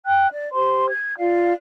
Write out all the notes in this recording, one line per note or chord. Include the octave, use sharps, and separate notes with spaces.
G5 F#6
D5
G4 C5 C6
G#6
F4 D5 F5